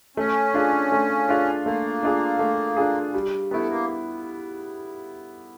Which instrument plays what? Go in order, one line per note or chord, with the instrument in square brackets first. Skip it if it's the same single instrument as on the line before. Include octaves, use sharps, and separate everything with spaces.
[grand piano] A3 [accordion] C#4
[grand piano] D4 F4 G#4
A3
D4 F4 G#4
[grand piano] A3 [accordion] A#3
[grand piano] D4 F4 G#4
A3
D4 F4 G#4
G3
[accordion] A3 [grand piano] B3 E4
[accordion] A#3